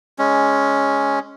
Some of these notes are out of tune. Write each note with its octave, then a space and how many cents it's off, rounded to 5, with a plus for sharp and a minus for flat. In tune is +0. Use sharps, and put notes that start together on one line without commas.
G#3 +0 C#4 +5